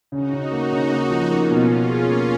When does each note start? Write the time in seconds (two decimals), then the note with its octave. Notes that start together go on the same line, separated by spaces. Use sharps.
0.12 C#3 D#4 F#4
0.33 C#3
0.51 A#3
0.71 C#3
0.91 A#3
1.11 F3
1.31 A#3 C#4 F4
1.51 B2
1.60 C#4 F4
1.70 B2
1.89 G#4
2.10 A#3